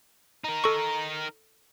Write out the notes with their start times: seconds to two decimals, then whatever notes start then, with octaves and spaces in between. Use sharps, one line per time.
0.44 D#4 A#4
0.64 A4 C#6